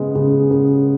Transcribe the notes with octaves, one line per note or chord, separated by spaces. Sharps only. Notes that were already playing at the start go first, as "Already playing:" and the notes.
Already playing: C#3 G#3 B3
C#3
C#3